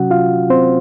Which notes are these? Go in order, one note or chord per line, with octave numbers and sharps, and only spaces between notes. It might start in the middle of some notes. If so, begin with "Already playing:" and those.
Already playing: C3 F#3 C#4 F#4 F#5
F4 F5
C4 C5